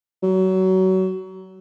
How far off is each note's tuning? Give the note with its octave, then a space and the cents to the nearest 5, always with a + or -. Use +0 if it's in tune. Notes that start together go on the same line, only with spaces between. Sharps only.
F#3 +25